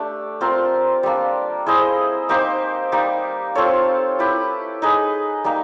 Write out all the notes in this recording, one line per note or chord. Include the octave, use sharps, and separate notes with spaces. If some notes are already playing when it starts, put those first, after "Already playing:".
Already playing: A3 D4 G4
C4 F4 A#4
G3 A#3 D4
E4 G#4 C5 D#5
A#3 D#4 G4 C5
G3 A#3 D#4
C4 F4 A4 C#5
E4 G4 B4
D#4 G#4 B4 D#5
G3 A#3 D#4